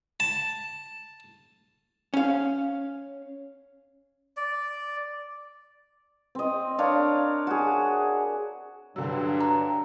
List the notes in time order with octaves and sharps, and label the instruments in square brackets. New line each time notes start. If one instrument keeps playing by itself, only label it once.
[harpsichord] A5
[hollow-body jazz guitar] C#4 F5
[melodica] D5
[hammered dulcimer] C4 D#5
D4 A#4 C#5 F5
F#4 G#4
[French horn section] G2 [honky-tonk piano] D3 F#3 [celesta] D4 E6
[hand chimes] A#5